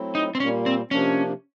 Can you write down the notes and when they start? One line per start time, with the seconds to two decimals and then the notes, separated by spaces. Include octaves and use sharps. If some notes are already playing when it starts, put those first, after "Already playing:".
Already playing: F#3 A3 C4 E4
0.15 D#4
0.35 C4
0.40 A#2 G3 A#3 C#4
0.66 C4
0.91 C3 F3 A#3 C#4 D4